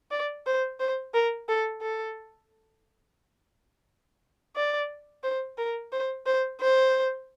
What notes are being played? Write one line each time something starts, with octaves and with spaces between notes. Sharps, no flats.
D5
C5
C5
A#4
A4
A4
D5
C5
A#4
C5
C5
C5